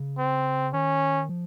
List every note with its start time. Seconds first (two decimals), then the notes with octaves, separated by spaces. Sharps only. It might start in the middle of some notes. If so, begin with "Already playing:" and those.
Already playing: C#3
0.18 C4
0.73 D#3 C#4
1.29 F3